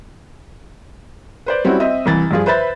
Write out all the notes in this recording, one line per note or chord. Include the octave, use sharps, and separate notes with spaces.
B4 C5 D5
G3 C4 C#4 E4 F#4
C4 D#5 E5
C2 E3 A6
G2 F3 F4 G#4
B4 C5 E5 B5 A6